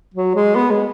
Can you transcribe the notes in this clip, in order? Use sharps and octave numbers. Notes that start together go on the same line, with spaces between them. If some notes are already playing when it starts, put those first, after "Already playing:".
F#3
G#3
B3
G#3